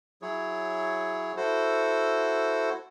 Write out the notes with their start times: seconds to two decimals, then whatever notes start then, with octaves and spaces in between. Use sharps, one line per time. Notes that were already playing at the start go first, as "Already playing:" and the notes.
0.22 F#3 E4 G#4 C#5
1.37 E4 F#4 A4 C5